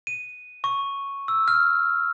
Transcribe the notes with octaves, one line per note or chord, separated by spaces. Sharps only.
D#7
C#6
E6
F6